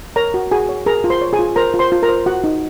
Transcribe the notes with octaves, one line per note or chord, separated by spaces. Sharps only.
A#4 C#5 A#5
F#4
F#4 G#4 G#5
C#5
G#4 A#4 A#5
F4
C5 C6
C#5
G#4 G#5
F4
A#4 C5 A#5
F4
C5 C6
F4
A#4 A#5
C5
F#4 F#5
D#4